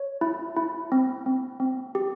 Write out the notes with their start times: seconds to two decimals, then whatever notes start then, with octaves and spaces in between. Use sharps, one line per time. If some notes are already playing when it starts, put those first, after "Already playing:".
Already playing: C#5
0.21 E4
0.56 E4
0.92 C4
1.26 C4
1.60 C4
1.95 G4